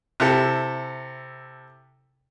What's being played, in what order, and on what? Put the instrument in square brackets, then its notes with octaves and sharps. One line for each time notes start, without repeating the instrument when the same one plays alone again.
[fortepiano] C3 E4 A4